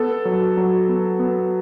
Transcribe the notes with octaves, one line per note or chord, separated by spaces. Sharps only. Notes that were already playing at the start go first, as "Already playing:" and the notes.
Already playing: B3 A4
F#3
F#3
B3
B3